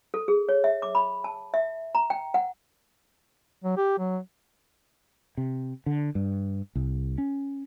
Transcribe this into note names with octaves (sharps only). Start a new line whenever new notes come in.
A4
G#4
C#5
E5
D6
B5
A5
E5
A#5
G5
F#5
F#3
G4
F#3
C3
D3
G2
C2
C#4